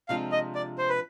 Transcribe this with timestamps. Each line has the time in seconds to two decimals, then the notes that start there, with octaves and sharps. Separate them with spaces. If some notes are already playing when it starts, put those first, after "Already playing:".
0.08 C3 F3 G#3 D4 F4 F5
0.32 D#5
0.55 D5
0.78 C5
0.89 B4